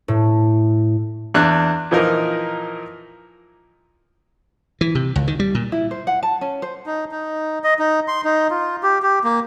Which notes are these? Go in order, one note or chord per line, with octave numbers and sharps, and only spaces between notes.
A2
E2 D4 F#6
A#2 E3 F3 D#4 A#4
E3
C3
C#2
D#3
G3
A#2
E4
C5
F#5
A5
C#4
C5
D#4
D#4
D#5
D#4
C6
D#4
F4
G4
G4
A#3